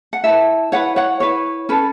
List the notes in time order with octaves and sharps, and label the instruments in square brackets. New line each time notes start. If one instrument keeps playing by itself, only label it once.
[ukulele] F#5
E4 B4 E5 A5
E4 B4 C#5 F#5
C#5 F#5
E4 B4 C#5
C#4 A4 B4